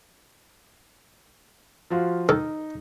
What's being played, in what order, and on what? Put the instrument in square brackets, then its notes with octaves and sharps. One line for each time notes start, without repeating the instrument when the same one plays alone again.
[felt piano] F3 F4 F#4
[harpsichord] D#3 A4 [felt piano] D#4